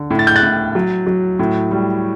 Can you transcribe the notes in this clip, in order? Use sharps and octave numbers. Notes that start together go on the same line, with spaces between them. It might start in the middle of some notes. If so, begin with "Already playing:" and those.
Already playing: D3
A2
A6
G6
F#6 A6
A2
F#3
F#3
A2
G3